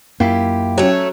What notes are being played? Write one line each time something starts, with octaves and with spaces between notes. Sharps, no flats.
F#2 A#3 E4 F4 G4
F#3 A3 C#4 C#5